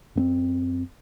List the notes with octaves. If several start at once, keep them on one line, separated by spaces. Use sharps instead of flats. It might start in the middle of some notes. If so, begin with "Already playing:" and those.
F#2 B3 C4